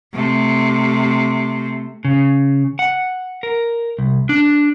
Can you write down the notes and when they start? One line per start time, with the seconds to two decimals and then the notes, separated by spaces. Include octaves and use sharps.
0.14 C3 A3
2.05 C#3
2.79 F#5
3.43 A#4
3.99 C2
4.29 D4